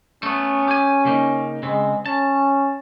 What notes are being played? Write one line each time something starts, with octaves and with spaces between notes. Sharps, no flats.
A3 B3 C#4
G4 G#5
C#3 A#3 D#4
C#3 G#3 C4
C#4 A5